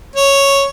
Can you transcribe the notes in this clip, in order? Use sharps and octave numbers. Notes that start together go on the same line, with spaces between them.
C#5